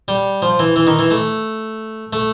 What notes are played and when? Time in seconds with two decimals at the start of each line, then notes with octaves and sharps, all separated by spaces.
0.08 G3
0.42 F3
0.59 E3
0.76 E3
0.87 D#3
0.99 E3
1.11 A3
2.13 A3